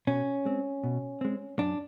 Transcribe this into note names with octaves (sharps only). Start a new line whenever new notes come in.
B2 C#4
G#3 C4
B2
G#3 C4
F#2 D4